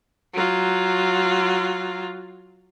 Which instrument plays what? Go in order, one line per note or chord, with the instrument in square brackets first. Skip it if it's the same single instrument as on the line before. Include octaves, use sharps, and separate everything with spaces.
[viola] F#3 F4